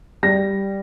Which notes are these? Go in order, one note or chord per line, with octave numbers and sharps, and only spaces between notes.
G3 A#6